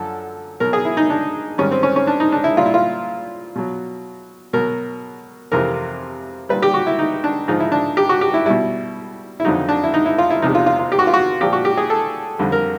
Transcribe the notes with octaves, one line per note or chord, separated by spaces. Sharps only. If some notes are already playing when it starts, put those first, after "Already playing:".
Already playing: F#2 D3 F3 A4
B2 F#3 A#4
G#4
E4
D#4
D4
G#2 D#3 G3 C#4
C4
C#4
C#4
D4
D#4
D4
E4
A#2 G3 F4
E4
F4
B2 F#3
B2 F#3 A#4
F2 C3 E3 A#4
A#2 G3 B4
G4
F#4
E4
D#4
D4
G#2 F3 D#4
E4
D4
G4
F#4
G4
E4
B2 G3 E4
E4
F2 D3 F#3 D#4
D4
E4
D#4
E4
F4
E4
E2 C3 F3 D#4
F4
F4
F4
G4
F#4
F4
F#4
A#2 F3 G4
F#4
G4
G#4
A4
F2 D3 G3
A#4